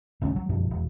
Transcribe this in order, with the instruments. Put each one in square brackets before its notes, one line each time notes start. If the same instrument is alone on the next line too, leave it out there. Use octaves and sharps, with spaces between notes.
[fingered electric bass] E1 D2 C#4
F#3
F#2 B2 F3
E1